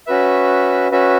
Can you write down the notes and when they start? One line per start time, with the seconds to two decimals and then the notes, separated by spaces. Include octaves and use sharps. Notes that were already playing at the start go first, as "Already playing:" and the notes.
0.07 C#4 F#4 B4 E5
0.91 C#4 F#4 B4 E5